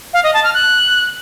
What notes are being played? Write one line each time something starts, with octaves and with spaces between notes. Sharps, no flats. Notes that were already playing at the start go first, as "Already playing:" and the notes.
F5
D#5
A5
F6
F#6